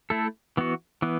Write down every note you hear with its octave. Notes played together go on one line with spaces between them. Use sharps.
A3 E4 A4
E3 B3 F#4
E3 B3